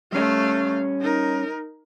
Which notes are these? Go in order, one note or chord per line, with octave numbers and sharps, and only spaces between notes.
G3 A3 C#4 F5
D#4 A#4